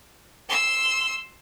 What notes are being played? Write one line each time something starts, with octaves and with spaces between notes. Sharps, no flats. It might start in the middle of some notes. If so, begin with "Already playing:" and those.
C6 E6